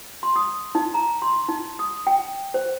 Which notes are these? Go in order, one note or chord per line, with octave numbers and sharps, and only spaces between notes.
C6
D#6
D#4
A#5
C6
D#4
D#6
G5
C5